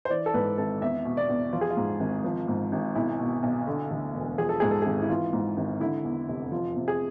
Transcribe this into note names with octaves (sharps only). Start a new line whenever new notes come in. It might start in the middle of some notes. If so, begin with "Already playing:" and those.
C5
E3 D5
A4
G#2 B4
G#1 A4
E2 E5
B2
D5
E2
F3 F4
G#4
F4
G#2
G#1
F3
G#2
G#1
B1 E4
B2
B1
D3
D2
E1
F3 G#4
A4
G#2 G#4
A4
G#1 G#4
E4
E3 F4
G#2
G#1
D3 E4
E2
F1
F3 F4
C3
G#4